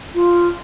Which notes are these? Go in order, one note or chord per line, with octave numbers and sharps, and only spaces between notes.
F4